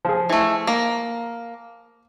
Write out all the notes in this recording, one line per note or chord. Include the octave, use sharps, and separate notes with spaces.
F3 G#4
E3 A3
A#3